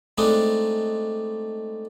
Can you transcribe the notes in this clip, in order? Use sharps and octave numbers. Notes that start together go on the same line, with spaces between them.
G#3 A3 C4 D4 D#4